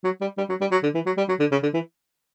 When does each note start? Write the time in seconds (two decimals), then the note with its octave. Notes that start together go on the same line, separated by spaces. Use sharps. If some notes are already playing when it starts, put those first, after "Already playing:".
0.04 F#3
0.21 G3
0.38 G3
0.49 F#3
0.61 G3
0.72 F#3
0.83 D3
0.95 E3
1.06 F#3
1.17 G3
1.29 F#3
1.40 D3
1.52 C#3
1.63 D3
1.74 E3